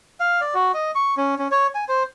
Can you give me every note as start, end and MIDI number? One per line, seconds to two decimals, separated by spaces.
0.20 0.41 77
0.41 0.54 74
0.54 0.72 66
0.74 0.91 75
0.95 1.15 85
1.17 1.35 61
1.39 1.48 61
1.51 1.67 73
1.75 1.85 80
1.89 2.03 72